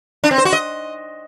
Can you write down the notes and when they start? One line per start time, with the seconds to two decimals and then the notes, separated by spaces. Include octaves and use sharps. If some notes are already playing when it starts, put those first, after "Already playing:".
0.24 D4
0.31 C4
0.38 C5
0.45 F#4
0.53 D#5